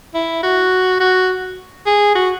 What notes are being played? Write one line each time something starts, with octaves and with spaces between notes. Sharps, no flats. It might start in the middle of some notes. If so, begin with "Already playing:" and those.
E4
F#4
F#4
G#4
F#4